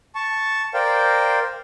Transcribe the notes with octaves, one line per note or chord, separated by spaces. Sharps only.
A5 C#6
A#4 C5 D5 F5 G5